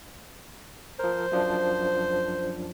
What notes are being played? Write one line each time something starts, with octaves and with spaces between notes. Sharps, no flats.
F3 A#4 C5
F#2 F3 D4